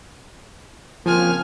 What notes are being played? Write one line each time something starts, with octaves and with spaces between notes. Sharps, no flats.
C#3 F3 A#3 C4 G#5 F6